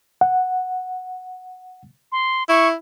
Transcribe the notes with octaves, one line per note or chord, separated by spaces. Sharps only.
F#5
C6
E4 C#6